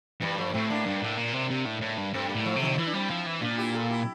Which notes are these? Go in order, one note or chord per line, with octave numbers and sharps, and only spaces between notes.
G2 E3 G3
F3 A3
A#3
A2 A3 C4
A#3 D4
G2
A2
A#2
C3
C3
A2
A2
G2
G2 A3 C4
G3 A#3
A2
F3 A3
C3
D3 F3
E3 E4
D4
G3 C4 E4
F3
E3
A#2 D4 F4
E4 G4
F4 A4
E4 G4